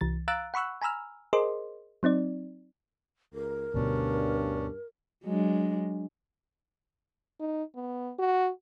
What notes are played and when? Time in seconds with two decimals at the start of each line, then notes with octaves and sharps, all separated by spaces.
0.01 C2 E3 A6
0.28 F5 A#5 E6 F#6 A6 D7
0.54 F#5 B5 C#6 E6 F#6
0.82 G#5 A#5 B5 E6 F6
1.33 G#4 A#4 C5 D#5 C6 D6
2.03 F#3 C4 D#4 D5
3.33 C#2 A#4
3.74 D2 G2 B2 D3 C#4 D4
5.24 F#3 G#3 D4
7.40 D#4
7.75 B3
8.19 F#4